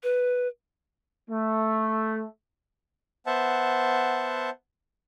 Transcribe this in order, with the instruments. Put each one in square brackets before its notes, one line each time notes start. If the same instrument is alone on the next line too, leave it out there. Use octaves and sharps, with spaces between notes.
[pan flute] B4
[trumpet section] A3
[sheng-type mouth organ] B3 C5 E5 F#5 A5